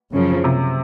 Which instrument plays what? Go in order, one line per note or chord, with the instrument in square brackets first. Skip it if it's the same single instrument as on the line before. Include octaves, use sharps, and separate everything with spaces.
[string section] F#2 C#3 F3
[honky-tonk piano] C3